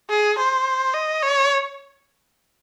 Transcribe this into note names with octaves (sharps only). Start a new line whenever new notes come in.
G#4
C5
D#5
C#5